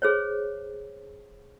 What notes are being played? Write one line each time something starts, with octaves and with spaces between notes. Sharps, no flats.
G#4 C5 C#5